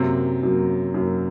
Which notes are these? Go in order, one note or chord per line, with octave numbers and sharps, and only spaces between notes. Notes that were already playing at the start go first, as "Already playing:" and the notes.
Already playing: F#2 C3 F#3 A#3 C4
F#2 F#3 A#3
F#2 F#3 A#3